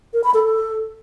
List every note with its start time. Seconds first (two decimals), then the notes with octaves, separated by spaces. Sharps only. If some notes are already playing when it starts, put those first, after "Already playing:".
0.13 A#4
0.24 B5
0.34 A4
0.45 A4